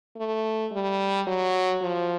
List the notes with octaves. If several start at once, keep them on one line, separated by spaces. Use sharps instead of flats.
A3
G3
F#3
F3